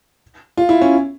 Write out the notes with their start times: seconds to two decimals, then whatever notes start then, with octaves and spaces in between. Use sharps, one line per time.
0.57 F4
0.69 E4
0.81 C#4